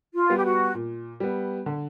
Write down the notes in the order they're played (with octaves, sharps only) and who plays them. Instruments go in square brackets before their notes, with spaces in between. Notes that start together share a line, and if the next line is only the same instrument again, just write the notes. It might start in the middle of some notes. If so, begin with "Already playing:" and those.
[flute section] F4
[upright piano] G3 B3
[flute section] G4
F#4
[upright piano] A#2
G3 B3
D3